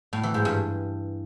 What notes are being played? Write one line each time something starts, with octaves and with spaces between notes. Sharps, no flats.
A2
E3
G#2
G2